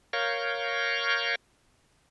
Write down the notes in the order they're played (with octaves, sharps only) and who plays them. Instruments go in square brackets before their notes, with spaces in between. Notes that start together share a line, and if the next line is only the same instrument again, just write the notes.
[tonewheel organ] A#4 C#5 F5 C#6 G6